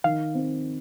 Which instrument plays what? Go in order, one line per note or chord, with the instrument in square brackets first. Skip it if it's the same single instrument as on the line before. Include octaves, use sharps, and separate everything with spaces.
[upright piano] D#3 [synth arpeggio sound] F5
[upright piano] C4